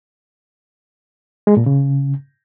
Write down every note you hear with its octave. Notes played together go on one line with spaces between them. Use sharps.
G#3
A#2
C#3